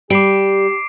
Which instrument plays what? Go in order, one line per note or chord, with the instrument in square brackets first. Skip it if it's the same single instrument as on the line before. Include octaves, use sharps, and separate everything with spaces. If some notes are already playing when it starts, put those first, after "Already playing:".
[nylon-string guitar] G3 [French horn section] G4 [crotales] D6 C7 D7